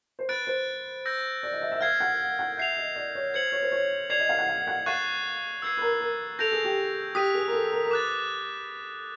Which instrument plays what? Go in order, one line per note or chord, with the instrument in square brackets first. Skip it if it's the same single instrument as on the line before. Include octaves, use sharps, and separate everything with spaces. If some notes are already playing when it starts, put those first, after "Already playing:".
[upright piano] C5
[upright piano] B4 [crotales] F#6 A6 D7
[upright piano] C5
[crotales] E6 G6 A#6
[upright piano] D5
D#5
E5
E5
[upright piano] F5 [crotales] F6 G#6 C7
[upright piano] F#5
F#5
[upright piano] E5 [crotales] G6 C7 F7
[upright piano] D#5
D5
C#5
[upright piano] C5 [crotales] G#6 C#7 F#7
[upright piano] C#5
C5
C#5
[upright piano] D5 [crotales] G#6 C7 F7
[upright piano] D#5
F5
F#5
F5
F#5
[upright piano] F5 [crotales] C#6 F#6 A6 C7 E7
[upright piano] B4 [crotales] E6 G#6 C7
[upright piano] B4
A#4
B4
A#4
[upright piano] A4 [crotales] G6 A#6 D7 F7
[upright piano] G#4
G4
[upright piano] G4 [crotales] D#6 F#6 B6 D#7
[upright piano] G#4
A#4
A4
A#4
A#4
[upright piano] B4 [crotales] D6 F#6 A6